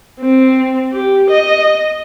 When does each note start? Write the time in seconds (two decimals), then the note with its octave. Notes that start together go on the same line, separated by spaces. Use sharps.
0.20 C4
0.92 G4
1.30 D#5